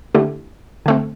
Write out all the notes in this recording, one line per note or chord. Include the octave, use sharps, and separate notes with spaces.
D3 A3 E4 G4
D3 A3 C4